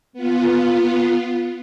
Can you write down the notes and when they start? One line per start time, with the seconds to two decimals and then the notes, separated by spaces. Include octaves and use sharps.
0.13 B3 F4